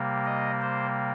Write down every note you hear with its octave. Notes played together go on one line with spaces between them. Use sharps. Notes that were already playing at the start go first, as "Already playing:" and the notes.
Already playing: C3 G3 A#3
D#5
C5